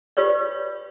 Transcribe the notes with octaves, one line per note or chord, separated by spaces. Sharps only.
F4 G4 B4 C#5 D5